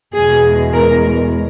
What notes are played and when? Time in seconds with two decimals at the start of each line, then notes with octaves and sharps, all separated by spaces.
0.14 E2 B2 G#3 G#4
0.73 A#4